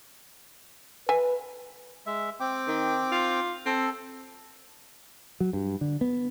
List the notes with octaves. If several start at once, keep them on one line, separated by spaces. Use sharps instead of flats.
B4 E5 G#5
G#3 E5
C4 G5 D6
D#3
F4
C4 A4
F#3
G2
D3
B3